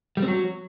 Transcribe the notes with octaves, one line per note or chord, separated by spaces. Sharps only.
G3
C4
F#3